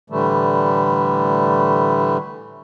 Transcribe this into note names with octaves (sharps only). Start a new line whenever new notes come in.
A2 D3 E3 G3 A3